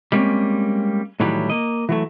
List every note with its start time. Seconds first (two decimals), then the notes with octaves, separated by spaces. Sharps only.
0.12 G3 G#3 A#3 C4 C#4
1.20 A2 D#3 E3 F#3 G3
1.50 A#3 D#5
1.89 E3 F#3 A3